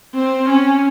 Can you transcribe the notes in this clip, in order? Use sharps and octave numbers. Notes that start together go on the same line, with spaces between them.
C4
C#4